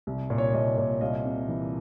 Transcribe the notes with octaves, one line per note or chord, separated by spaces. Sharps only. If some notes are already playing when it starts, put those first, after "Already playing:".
C2
A#2
C#5
C2 C#5 D#5
A#2
C2 D#5 F5
C3
E3